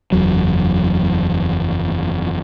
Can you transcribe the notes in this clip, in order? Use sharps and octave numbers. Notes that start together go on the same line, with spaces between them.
F#1 E2 F#3